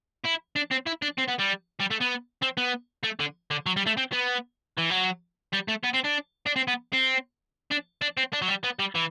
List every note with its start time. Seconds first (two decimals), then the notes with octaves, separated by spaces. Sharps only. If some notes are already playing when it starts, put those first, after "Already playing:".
0.24 E4
0.56 D4
0.71 C4
0.87 E4
1.02 D4
1.18 C4
1.28 B3
1.39 G3
1.80 G3
1.91 A3
2.00 B3
2.42 C4
2.57 B3
3.04 A3
3.20 D3
3.51 D3
3.66 F#3
3.77 G3
3.86 A3
3.97 C4
4.13 B3
4.78 E3
4.91 F#3
5.53 G3
5.68 A3
5.84 B3
5.94 C4
6.05 D4
6.46 D4
6.56 C4
6.68 B3
6.93 C4
7.71 D4
8.01 D4
8.17 C4
8.33 D4
8.42 F#3
8.48 G3
8.64 B3
8.79 G3
8.95 E3